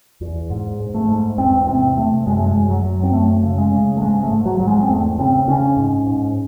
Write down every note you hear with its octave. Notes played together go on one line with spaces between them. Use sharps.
E2
G#2
G#2
A3
G#2
E2 C4
C3 C4
C3 A3
F#2 G#3
A3
G#3
F#2
F#3
F#2
C4
F#2 A3
C#3
G#3
C#3
A3
G#2 G#3
A3
G#2
F#3
G#2 F#3
G#3
C4
E2 A3
C#3 C4
C#3 C#4
G#2
G#2